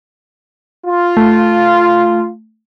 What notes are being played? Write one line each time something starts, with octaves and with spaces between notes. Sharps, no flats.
F4
A3